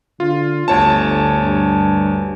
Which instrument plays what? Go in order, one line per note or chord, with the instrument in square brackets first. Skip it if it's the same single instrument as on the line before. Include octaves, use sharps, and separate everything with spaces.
[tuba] D3 [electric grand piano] F4
[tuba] G1 [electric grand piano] D2 C#5 A5
[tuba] G2